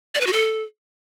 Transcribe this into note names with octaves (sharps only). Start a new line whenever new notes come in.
D5
B4
F#4
A4